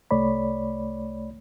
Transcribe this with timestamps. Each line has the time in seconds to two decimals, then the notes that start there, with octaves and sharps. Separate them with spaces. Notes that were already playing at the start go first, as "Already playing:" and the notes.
0.11 C2 A3 C#5 D5 B5